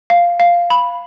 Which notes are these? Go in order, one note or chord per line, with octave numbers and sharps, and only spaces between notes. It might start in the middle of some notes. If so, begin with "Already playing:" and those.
F5
F5
B5